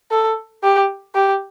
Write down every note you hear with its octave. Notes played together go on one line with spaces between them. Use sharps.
A4
G4
G4